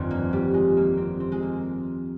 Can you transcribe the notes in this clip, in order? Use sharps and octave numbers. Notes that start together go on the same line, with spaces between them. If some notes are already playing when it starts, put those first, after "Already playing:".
Already playing: G1 F2 D#3 C4
A#3
G3
G#3
A#3
C4
C4
G#3
A#3